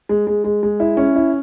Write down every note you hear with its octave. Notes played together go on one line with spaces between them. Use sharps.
G#3
G#3
G#3
G#3
E4
C#4
E4